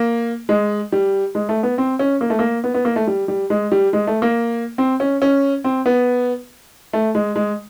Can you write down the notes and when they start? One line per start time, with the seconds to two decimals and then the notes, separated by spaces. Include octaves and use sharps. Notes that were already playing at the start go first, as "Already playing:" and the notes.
Already playing: A#3
0.49 G#3
0.92 G3
1.35 G#3
1.49 A3
1.63 B3
1.78 C4
1.99 C#4
2.21 A#3
2.30 A3
2.39 A#3
2.64 B3
2.74 B3
2.85 A#3
2.96 A3
3.07 G3
3.28 G3
3.50 G#3
3.72 G3
3.93 G#3
4.07 A3
4.22 A#3
4.78 C4
5.00 C#4
5.22 C#4
5.64 C4
5.86 B3
6.93 A3
7.15 G#3
7.36 G#3